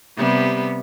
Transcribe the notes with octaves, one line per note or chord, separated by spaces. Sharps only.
C3 G3 B3